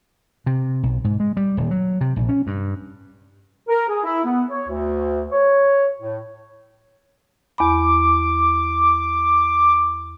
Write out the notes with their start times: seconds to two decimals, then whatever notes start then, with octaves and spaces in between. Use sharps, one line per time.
0.46 C3
0.83 B1
1.04 G#2
1.20 G#3
1.37 G3
1.57 D#1
1.71 F#3
2.01 C3
2.16 A#1
2.29 C#4
2.47 G2
3.69 A#4
3.89 G#4
4.04 E4
4.24 B3
4.50 C#5
4.68 D2
5.32 C#5
6.00 A2
7.58 E2 B5 D6